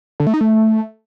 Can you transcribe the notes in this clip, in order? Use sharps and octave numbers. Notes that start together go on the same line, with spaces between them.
D3
A3
D#4
A3